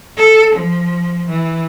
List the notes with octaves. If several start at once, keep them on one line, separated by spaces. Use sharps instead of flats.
A4
F3
E3